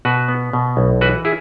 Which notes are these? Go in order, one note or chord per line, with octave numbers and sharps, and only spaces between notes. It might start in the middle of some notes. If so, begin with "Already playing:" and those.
B2 F#4 B4
B3
B2
B1
E3 F#4 B4
E4 G#4